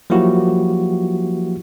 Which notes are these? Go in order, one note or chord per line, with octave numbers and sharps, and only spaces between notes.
F3 F#3 A#3 E4 F#4 G4